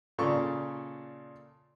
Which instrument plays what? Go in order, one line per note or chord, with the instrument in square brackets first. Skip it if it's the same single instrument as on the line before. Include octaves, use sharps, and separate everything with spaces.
[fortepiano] A#2 C#3 A4 D5 C#6